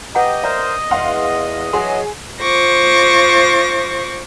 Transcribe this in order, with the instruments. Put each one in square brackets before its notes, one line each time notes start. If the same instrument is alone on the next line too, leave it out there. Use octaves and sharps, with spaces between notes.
[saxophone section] G4 [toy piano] B4 F#5 A#5 [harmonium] D#5
[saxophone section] A#4 C5 [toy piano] D5 E5 A#5
[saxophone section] E2 [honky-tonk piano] F5 F#5 C6
[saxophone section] E3 F#3 [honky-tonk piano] G#4 [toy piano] C6
[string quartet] F4 C5 C#6 D6 A#6